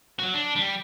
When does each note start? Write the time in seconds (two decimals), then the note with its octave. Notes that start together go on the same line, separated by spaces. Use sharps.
0.19 F#3 F#4
0.34 D4
0.56 G3